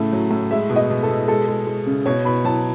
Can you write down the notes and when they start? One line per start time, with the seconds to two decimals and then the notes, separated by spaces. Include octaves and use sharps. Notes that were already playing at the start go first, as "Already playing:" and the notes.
Already playing: A2 C#3 A3 A5
0.12 F#3
0.31 A2
0.51 G#3 E5
0.70 B2
0.76 D#5
0.90 B2
1.03 A4
1.09 B2
1.28 G#3 A4
1.48 G#3
1.67 G#3
1.86 C#3
2.06 B2 C#5
2.25 B2 B5
2.45 F#3 A5